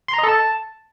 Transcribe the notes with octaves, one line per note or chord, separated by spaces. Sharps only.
C6
A#5
D#5
A4
A5